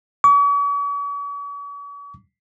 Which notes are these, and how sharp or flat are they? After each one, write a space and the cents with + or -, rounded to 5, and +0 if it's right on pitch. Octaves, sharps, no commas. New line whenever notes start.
C#6 +45